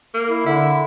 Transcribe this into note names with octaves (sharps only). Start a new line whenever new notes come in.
A#3
E4
D3 E4